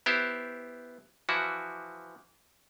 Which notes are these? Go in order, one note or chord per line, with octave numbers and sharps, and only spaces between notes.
B3 E4 G4 C5
E3 F3 E4 F#4